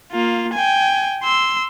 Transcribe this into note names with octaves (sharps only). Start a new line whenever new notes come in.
A#3 F4
G5 G#5
C6 E6